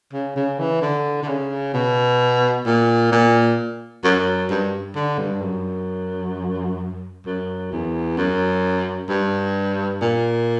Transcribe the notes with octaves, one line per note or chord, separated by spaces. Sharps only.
C#3
C#3
E3
D3
D3
C#3
B2
A#2
A#2
F#2
G2
D3
G2
F#2
F#2
E2
F#2
G2
A#2